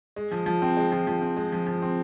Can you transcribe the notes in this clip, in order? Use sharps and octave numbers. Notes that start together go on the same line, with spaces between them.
G#3
F3
F3
C4
G#3
F3
F3
C4
G#3
F3
F3
C4